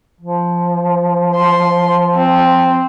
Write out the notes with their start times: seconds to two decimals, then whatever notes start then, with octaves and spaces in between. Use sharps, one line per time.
0.21 F3
1.36 C6
2.15 C4